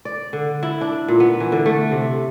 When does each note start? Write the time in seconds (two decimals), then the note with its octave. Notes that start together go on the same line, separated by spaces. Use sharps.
0.05 D5
0.33 D3
0.63 E4
0.81 D4
1.08 A#2
1.20 B3
1.40 E3
1.52 D3
1.66 A3
1.91 C3